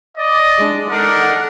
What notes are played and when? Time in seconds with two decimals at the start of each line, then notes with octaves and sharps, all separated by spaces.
0.18 D5 D#5
0.58 G#3 D4
0.90 D4 D#4 A4 A#4 F#5